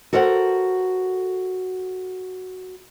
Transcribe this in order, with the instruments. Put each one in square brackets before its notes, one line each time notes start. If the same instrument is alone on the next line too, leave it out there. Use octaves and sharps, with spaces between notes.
[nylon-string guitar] F#4 A4 A#4 C5 F#5